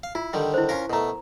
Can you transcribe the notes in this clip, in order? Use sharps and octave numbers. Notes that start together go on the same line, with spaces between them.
F5
E4 F4
D3 D#3 G3
E4 C5
C#4 F4 A#4
B2 A3 A#4 A#5